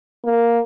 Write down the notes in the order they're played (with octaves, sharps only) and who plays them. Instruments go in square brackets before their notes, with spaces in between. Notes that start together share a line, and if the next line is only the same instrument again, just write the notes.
[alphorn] A#3